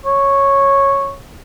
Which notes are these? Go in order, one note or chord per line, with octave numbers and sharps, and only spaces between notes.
C#5